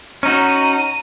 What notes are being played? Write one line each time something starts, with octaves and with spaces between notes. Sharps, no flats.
C#4 D#4 F#4 A#5 D#7